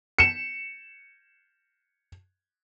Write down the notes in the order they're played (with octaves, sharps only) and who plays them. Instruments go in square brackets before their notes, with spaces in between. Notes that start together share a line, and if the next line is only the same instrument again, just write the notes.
[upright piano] C#7 E7